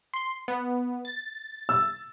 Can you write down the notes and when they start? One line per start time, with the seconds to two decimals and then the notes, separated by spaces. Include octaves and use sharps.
0.14 C6
0.48 B3
1.05 A6
1.69 E6